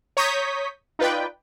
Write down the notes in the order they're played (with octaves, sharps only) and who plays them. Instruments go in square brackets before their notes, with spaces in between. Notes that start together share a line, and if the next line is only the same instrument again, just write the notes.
[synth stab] C#5 A#5 C#6 D#6 G6 B6
D#4 F4 B4 D5 G5